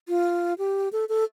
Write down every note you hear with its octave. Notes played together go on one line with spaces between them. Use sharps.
F4
G4
A4
A4